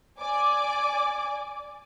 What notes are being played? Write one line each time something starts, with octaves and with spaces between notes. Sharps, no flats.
D5 G#5 D6